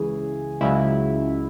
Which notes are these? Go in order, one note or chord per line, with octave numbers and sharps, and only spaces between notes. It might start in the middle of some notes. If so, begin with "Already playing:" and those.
Already playing: C#2 C#3 E3 G#4
C#2 C#3 F#3 E4